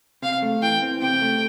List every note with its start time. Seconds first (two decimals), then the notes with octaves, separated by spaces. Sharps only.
0.22 C3 F5
0.42 A3
0.62 E3 G5
0.82 C4
1.02 C3 G5
1.22 A3